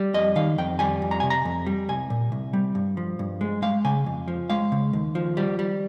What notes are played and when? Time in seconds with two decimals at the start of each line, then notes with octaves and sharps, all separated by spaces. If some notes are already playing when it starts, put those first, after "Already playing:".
Already playing: G3
0.14 F2 D#5
0.36 D#3 F5
0.58 F2 G5
0.79 G3 G#5
1.02 F2
1.11 A#5
1.20 C3 G#5
1.30 A#5
1.45 F2
1.66 G3
1.89 C2 G#5
2.10 A#2
2.32 C2
2.53 G3
2.75 G2
2.97 F3
3.19 G2
3.41 G#3
3.62 G#3 F5
3.85 C#3 G#5
4.06 F2
4.28 F3
4.50 G#3 F5
4.72 C#3
4.93 D#2
5.15 F3
5.37 G3
5.59 G3